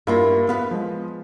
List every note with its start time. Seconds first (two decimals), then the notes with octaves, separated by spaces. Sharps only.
0.07 G2 A#3 E4 F4
0.49 B3 B4 F5
0.71 F3 G#3